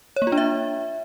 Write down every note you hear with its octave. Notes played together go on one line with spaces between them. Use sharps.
C#5
A#3
F4
D4
E5